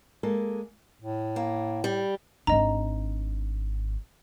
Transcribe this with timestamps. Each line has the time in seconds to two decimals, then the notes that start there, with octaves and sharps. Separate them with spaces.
0.23 G#3 A#3 A4
1.01 A2
1.36 A#3
1.84 G3
2.47 G#1 D4 D#5 A#5